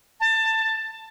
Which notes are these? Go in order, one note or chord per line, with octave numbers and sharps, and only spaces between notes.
A5